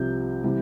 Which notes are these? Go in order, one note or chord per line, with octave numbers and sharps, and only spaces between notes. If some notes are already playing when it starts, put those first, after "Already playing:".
Already playing: C2 C3 F3 G6
C3 E3 G3